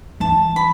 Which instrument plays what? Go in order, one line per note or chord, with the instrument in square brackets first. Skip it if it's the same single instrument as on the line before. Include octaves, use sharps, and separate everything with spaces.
[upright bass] E3 [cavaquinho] A5
[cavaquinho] B5